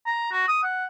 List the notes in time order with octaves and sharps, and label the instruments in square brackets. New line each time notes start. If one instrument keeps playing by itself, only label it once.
[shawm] A#5
F#4
D#6
F#5